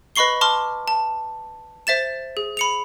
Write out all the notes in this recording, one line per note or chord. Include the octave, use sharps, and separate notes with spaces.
B4 D#5 B5 C#6 C7 G7
A5 C6 D6 F6
A5
C5 E5 A6 E7
G#4
B5 C#7 F7